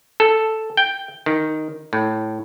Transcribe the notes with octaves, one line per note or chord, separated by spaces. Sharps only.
A4
G5
D#3
A2